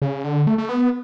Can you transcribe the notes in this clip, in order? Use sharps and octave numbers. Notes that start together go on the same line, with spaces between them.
C#3
D3
A3
A3
B3